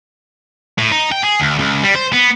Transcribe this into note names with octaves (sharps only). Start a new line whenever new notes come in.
A2
D#4
G5
G#4
D2
C#2
G3
C5
B3